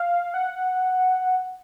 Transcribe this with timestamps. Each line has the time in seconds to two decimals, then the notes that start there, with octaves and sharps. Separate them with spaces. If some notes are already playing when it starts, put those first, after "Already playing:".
Already playing: F5
0.34 F#5